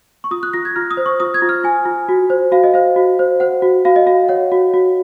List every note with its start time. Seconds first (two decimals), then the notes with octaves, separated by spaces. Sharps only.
0.24 C#6
0.31 F4 D#6
0.43 F#6
0.53 F4 A#6
0.65 G#6
0.76 F4 F6
0.91 D#6
0.97 C5
1.06 C#6
1.20 F4 D#6
1.34 G#6
1.42 F4
1.49 F6
1.64 F4 G#5
1.85 F4
2.09 F#4
2.30 C5
2.52 F#4 F5
2.64 D#5
2.74 C5 F5
2.96 F#4
3.19 C5
3.40 C5 F#5
3.62 F#4
3.85 F#4 F5
3.96 D#5
4.06 F#4 F5
4.28 C#5 F#5
4.52 F#4
4.74 F#4